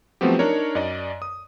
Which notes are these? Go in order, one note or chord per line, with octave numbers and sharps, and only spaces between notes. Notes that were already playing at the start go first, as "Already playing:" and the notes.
F3 F#3 A3 B3 C4 G4
D4 D#4 A#4 C#5
F#2 D5 D#5
D#6